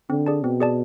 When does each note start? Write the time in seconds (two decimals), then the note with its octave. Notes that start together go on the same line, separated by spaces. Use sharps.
0.10 D3 C4
0.26 G#4 D5 A5
0.44 B2 C4
0.61 G#4 D5 A5